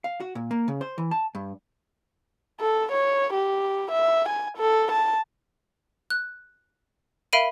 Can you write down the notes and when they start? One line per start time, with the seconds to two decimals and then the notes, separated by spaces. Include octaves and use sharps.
0.04 F5
0.20 F#4
0.35 A#2
0.51 A#3
0.68 C#3
0.81 C5
0.98 E3
1.11 A5
1.35 G2
2.60 A4
2.92 C#5
3.33 G4
3.91 E5
4.29 G#5
4.57 A4
4.92 A5
6.10 F#6
7.33 A#4 E5 F5 B5 D7 D#7